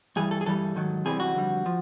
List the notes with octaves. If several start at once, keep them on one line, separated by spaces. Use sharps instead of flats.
G2 E3 G3 G#4
A4
G#4
G2 E3 G3 A4
G#2 D#3 F#3
E2 C3 E3 G3 G#4
F#4
F2 D3 G3
F3